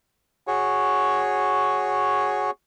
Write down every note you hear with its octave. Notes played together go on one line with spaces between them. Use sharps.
F#4 G#4 C#5